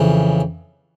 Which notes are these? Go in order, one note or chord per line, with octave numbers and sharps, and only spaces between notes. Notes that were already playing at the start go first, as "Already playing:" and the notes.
Already playing: F2 C#3 E3